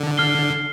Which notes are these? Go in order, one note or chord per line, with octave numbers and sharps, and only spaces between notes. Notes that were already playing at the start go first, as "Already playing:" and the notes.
Already playing: D3
F6 C7 G7